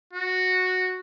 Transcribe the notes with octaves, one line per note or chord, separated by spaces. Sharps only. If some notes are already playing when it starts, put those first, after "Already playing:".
F#4